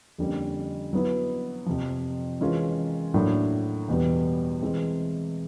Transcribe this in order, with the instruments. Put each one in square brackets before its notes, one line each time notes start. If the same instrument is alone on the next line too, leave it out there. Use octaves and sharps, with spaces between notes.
[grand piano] F2 D3 G3 A#3 C#4
F#3 B3 E4
F2 C3 F3
E3 G#3 C#4 F4 A#4
A2 F#3 A#3 D4
E2 B2 G3 B3
E3 G#3 C4